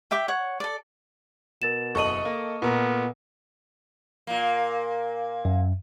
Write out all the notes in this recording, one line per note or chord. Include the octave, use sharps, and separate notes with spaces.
G4 E5 G5 D6
C#5 F#5
A4 D5
B2 A#4 A6 E7
F#1 A4 D#5 C#6 D#7 F#7
A#3
A#2 B3 A#4
A#2 A#3
F#2